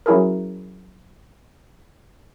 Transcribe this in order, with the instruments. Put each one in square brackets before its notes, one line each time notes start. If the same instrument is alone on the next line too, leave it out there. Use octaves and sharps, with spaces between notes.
[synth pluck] F#3 C#4 E4 G#4 A#4